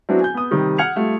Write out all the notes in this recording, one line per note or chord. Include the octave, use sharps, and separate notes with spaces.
F#3 B3 C4 D4 E4 F#4
G#5 G6
B3 D#6
C3 D#3 G3
F#5 F6 G#6 C#7 F7
G3 A3 F4